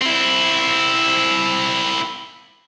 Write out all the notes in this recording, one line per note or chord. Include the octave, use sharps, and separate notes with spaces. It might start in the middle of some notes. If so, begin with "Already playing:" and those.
C4 E4